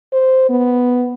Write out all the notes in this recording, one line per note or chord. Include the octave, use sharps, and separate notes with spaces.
C5
B3